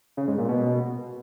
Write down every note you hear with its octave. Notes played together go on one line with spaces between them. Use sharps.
C#3
G#2
A#2
B2